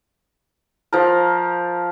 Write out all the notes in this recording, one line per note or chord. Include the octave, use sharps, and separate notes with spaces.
F3 A#4